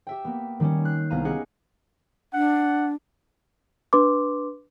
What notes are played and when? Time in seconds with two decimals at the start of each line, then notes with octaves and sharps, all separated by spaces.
0.07 G4 E5 G5
0.25 A#3 B3
0.60 D#3 G3 C#4
0.85 F#6 G6 C7
1.10 C2 B3 F5 A#5 D#7
1.24 B3 C#4 G4 G#4 D#5 F#5
2.33 D4 F#5
3.93 D4 B4 C6 D6